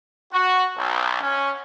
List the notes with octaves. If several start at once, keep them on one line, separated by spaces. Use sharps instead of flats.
F#4
B1
C#4